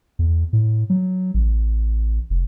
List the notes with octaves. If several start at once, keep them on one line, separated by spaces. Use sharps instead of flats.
E2
A2
F#3
A1
F1